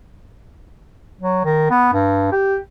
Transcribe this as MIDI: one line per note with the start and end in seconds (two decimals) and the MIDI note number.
1.21 1.40 54
1.45 1.68 51
1.70 1.91 59
1.93 2.27 43
2.32 2.57 67